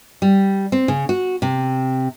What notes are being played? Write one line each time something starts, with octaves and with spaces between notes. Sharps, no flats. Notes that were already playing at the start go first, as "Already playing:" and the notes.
G3
C4
C#3
F#4
C3